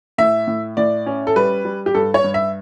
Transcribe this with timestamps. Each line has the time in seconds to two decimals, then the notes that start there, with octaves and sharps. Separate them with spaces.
0.18 A2 E5
0.48 A2
0.77 A2 D5
1.06 C#4
1.27 A4
1.36 G3 B4
1.65 G3
1.86 G4
1.95 G2 A4
2.14 C#5
2.24 G2
2.34 E5